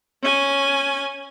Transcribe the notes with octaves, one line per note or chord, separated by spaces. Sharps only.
C#4 G#5